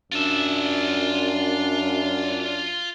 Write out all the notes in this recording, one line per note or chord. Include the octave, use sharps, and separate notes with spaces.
F#2 D4 F4 E5